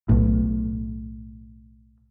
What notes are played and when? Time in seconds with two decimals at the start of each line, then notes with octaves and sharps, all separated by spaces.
0.09 B1 A2